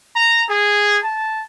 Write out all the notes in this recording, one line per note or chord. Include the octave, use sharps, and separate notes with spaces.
A#5
G#4
A5